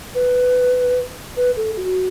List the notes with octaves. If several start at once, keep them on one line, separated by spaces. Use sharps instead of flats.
B4
B4
A4
F#4